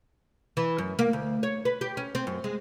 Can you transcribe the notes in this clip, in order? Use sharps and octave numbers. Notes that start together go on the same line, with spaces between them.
E3
F#2
A#3
D2
C#5
B4
G4
C#4
C4
F#2
G#3